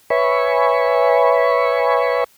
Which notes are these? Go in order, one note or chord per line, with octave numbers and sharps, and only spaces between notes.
B4 C#5 E5 G#5 B5 C#6